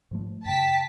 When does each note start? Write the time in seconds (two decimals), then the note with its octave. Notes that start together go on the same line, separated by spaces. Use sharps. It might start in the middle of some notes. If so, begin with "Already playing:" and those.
0.11 G#2 F3 A3
0.45 F#2 C#3 G5 A5 B6